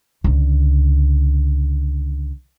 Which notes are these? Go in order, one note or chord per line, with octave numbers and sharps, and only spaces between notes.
C#2 D3